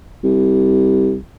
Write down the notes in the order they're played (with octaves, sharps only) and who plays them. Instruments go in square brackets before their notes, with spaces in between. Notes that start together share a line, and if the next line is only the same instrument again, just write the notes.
[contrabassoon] C2